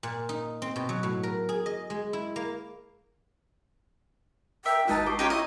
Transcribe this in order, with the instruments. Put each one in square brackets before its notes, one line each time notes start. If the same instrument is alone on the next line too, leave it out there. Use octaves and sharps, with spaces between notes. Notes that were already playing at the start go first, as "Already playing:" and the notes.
[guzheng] A#2
D#4
C4
B2
F#3
A2
A#4
G#4
D#5
G#3
E4
A#3
[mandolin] A#3 A#4 E5 [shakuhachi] G5
[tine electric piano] G#1 G#3 F4 [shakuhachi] D#4 [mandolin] F#4 B4 A5
[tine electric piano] G4 C#6 C7 [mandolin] D#5 D6
[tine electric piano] C#4 [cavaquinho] D#4 G4 C#5 [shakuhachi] F4 [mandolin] G5 A#5
[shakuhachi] E4 [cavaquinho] D#5 [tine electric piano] C#6